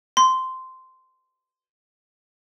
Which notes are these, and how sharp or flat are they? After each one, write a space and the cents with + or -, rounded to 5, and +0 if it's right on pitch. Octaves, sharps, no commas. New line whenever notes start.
C6 -10